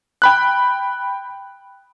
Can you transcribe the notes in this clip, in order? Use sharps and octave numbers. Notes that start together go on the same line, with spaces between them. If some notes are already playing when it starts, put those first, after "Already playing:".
G5 B5 F#6